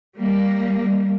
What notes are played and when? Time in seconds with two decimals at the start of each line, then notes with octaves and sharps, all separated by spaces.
0.17 G3 A#3